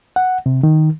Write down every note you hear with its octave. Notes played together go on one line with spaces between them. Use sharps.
F#5
C3
D#3